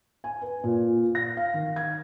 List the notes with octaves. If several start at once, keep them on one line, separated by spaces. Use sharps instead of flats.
G#5
B4
A#2
A#6
F5
D#3
G#6